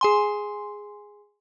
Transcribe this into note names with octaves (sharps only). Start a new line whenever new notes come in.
G#4 G#5 C6